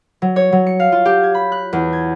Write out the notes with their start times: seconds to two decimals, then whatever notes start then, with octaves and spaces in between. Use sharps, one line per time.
0.22 F#3
0.36 C#5
0.52 F#3
0.67 C#7
0.80 F5
0.92 F4
1.05 G4
1.23 G#6
1.34 B5
1.52 F#6
1.73 E2
1.93 G#6